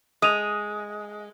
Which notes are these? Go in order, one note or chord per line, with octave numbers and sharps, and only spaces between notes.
G#3 D#6 D#7 F7